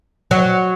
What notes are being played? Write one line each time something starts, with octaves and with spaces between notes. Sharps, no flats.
F#3